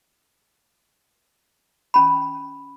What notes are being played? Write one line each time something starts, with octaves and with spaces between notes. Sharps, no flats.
C#4 B5